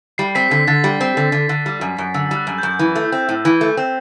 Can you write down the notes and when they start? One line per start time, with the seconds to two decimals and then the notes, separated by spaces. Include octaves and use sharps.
0.18 G3 C7
0.35 C4 B6
0.51 D3 B6
0.67 D3 A6
0.84 G3
1.01 C4
1.17 D3
1.32 D3
1.49 D3
1.66 G3
1.81 F#2
1.98 F#2
2.14 D3 E6
2.31 G3
2.36 F#6
2.47 F#2
2.58 F#2 G6
2.79 E3
2.95 A3
3.12 C4
3.29 A2
3.45 E3
3.61 A3
3.77 C4